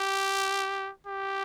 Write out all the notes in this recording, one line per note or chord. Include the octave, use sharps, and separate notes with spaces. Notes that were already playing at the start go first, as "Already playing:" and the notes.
Already playing: G4
G4